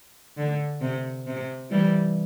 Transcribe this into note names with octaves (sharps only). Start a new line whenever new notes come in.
D3
C3
C3
E3 G3